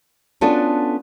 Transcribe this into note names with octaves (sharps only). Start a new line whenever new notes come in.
B3 C#4 D4 F4 F#4 A4